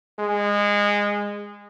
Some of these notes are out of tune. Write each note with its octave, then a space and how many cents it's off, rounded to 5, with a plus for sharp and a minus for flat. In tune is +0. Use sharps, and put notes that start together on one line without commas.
G#3 -20